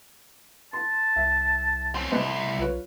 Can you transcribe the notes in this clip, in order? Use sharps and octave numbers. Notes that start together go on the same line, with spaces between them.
A5 C6
C2 E5
C4 C#4
C2 A2 C5 D#5
B1 F4 B4 C#5